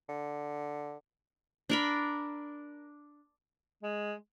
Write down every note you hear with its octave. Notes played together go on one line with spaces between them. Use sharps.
D3
D4 A#4 B5
G#3